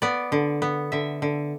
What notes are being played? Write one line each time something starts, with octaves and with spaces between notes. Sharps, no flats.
B3 D5
D3
B3
D3 E5
D3